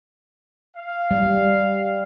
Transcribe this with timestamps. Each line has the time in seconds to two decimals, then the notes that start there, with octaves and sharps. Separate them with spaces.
0.76 F5
1.11 G3